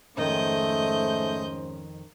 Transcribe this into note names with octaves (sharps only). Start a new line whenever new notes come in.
F2 G#2 D#3 A3 C#4 C5 D#5 G6